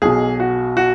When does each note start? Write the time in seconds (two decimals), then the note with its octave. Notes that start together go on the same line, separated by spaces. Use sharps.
0.02 B1 B2 G#4
0.40 F#4
0.77 F#4